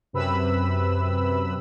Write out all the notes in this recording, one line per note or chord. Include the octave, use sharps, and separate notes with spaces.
F#2 C3 B4 B5 E6